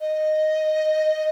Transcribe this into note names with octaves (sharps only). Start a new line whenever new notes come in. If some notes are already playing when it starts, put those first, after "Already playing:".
D#5